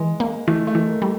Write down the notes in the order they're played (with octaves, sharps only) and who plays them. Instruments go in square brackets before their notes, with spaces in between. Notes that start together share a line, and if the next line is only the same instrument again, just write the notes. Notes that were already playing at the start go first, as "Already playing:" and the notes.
Already playing: [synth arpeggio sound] E3 [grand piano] G#3
[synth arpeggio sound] A#3
[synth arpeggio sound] E3 [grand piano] A3
[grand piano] A3
[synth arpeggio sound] E3
[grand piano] A#3
[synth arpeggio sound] G3